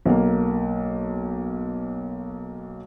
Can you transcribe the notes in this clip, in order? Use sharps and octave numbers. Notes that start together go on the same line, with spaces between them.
B1 A#3